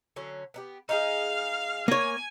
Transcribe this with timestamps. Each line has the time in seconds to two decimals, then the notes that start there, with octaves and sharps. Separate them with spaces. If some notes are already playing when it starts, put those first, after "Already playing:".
0.16 D3 F#3 C#4
0.54 B3 D4 G4
0.89 D#4 E4 G#4 F5
1.88 A#3 C#5 G#5